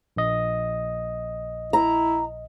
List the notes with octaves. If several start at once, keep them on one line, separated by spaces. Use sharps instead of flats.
A#1 D#5
E4 A#5